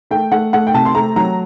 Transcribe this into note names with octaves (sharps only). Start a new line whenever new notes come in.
A3 G5
A3 F#5
A3 F#5
G5
C3 A5
C6
A3 A#5
F#3 A#5